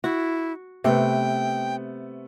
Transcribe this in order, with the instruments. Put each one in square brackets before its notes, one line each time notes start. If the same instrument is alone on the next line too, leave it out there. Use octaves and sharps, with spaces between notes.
[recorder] E4 [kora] F#4
[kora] C3 [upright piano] A3 B3 [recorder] G5